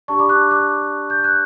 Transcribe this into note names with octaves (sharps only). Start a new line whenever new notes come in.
D4 G4 D5 A5 C#6
B5 D6
D6 F#6
D6 F#6
G6
F#6